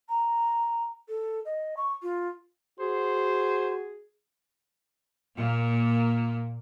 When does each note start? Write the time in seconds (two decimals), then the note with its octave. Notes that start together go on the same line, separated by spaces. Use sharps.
0.09 A#5
1.08 A4
1.45 D#5
1.77 C#6
2.02 F4
2.80 F#4 G#4 C5
5.35 A#2 A#3